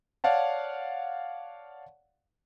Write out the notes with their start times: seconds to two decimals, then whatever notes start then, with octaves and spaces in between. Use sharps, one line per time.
0.24 C#5 D5 F5 F#5 A5